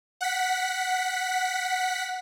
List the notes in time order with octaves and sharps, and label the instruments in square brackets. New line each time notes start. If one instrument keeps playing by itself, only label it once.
[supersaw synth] F#5 B6